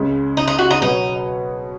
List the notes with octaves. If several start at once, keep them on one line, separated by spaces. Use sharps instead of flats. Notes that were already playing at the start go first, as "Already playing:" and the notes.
Already playing: C#2 C#3 G#3
D#4
D#4
F#4
D#4
B2 F#3 B3 D#4 F#4 C#5